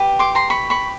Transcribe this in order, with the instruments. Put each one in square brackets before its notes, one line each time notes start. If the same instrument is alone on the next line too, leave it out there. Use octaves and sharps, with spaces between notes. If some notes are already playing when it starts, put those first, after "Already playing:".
Already playing: [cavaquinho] G4 B4
C6 D6
A#5 C6
B5 C#6
B5 C#6